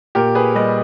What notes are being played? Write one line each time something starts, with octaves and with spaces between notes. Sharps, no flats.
A#2 G4 A#4
G#4 B4
G3 B4 D#5